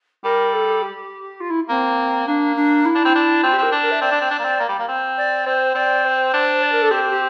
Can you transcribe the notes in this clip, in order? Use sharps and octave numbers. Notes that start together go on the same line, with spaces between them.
G3 A#4
A4
G4
F4
E4
A#3 C4
A#3 D4
D4
E4
D4
C4
D4
C4 F4
G4
C4 A#4
D4
A#4
E5
C4 D5
D4
C4
D4
A#3
C4
A#3
G3
A#3
C4
D5
C4 C5
C4 D5
C5
D4
D5
A#4
A4
C4 G4
G4